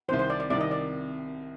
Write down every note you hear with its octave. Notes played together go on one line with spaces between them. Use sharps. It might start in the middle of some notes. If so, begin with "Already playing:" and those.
C2 C3 D#3 C5
C5
D5
D5
C2 C3 D#3 D5
D#5
D5